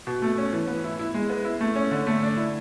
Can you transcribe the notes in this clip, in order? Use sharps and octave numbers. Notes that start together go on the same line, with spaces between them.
B2
A3
C#4
E3
B3
E4
E4
G#3
B3
E4
A3
C#4
D3
A3
D4
E4